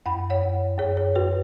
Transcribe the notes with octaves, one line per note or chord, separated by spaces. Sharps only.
F#2 F#5 B5
C#5 F#5
F#2
F#2 G#4 C#5
G#4 C#5
F#2 F#4 B4